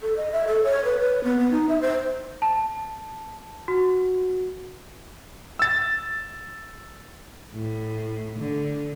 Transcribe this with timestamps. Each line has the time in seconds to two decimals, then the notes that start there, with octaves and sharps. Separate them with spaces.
0.02 A4
0.17 D#5
0.32 E5
0.47 A4
0.64 C#5
0.85 B4
0.99 B4
1.24 B3
1.39 B3
1.51 D#4
1.69 E5
1.82 C5
2.42 A5
3.68 F#4
5.59 E6 A6
7.55 A2
8.39 D3